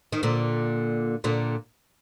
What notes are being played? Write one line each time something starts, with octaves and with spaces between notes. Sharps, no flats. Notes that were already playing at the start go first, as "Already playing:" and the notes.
D#3
A#2 D3
A#2 D3